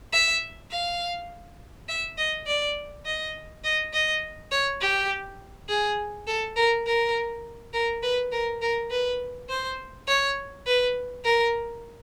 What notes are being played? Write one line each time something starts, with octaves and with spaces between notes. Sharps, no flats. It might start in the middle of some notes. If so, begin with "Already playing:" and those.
E5
F5
E5
D#5
D5
D#5
D#5
D#5
C#5
G4
G#4
A4
A#4
A#4
A#4
B4
A#4
A#4
B4
C5
C#5
B4
A#4